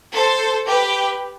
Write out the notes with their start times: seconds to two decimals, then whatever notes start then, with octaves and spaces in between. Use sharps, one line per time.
0.14 A4 C5
0.68 G4 B4